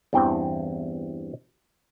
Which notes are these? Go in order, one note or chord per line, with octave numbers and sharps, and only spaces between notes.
E2 G2 E3 C4 G5